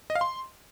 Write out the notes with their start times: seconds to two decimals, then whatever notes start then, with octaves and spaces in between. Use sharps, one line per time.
0.10 D#5
0.15 F5
0.21 C6